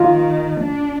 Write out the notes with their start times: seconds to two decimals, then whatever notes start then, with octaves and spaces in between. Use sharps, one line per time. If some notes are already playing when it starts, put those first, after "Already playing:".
Already playing: D#3 F4
0.61 D4